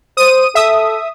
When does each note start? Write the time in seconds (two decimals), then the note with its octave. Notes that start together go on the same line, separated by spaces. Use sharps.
0.17 C5 D#6 D#7
0.55 A4 E5 D#6